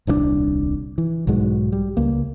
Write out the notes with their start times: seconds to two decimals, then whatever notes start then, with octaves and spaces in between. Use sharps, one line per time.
0.07 D#1 C2 C#3 D4
0.98 E3
1.27 B1 G#2 F#3 G#3
1.72 G3
1.97 C#2 A#3